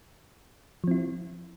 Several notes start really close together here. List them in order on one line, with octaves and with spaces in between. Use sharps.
F3 C4 E4